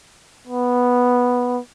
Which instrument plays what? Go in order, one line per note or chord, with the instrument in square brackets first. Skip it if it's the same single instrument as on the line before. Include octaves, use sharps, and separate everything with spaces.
[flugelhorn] B3